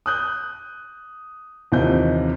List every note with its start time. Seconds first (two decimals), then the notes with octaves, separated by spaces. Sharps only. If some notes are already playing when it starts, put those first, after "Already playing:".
0.06 D#6 F#6 G6
1.72 D#2 C3 E3 F4 D#5 G6